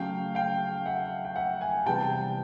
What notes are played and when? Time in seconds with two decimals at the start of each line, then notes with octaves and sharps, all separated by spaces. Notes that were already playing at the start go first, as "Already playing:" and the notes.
Already playing: C#3 F#3 A3 F5 G5
0.35 F5 G5
0.86 E5 F#5
1.25 G5
1.36 E5 F#5
1.61 F#5 G#5
1.86 C3 E3 G3 B3 G5 A5